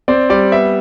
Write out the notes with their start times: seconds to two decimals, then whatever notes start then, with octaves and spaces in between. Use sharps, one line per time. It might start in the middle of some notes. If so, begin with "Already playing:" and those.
0.08 C4 D5
0.30 G3 D5
0.52 B3 E5